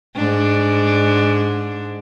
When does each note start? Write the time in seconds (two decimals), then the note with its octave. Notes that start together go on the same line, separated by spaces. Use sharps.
0.16 G#2 D4